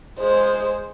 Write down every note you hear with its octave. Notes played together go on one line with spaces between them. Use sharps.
G#3 C5